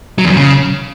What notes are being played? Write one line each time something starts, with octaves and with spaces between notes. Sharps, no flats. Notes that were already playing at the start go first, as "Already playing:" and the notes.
F#3
E2
F#2
C#3